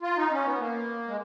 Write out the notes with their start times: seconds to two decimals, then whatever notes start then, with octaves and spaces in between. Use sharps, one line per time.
0.02 F4
0.17 D#4
0.32 C#4
0.46 B3
0.60 A#3
1.08 G#3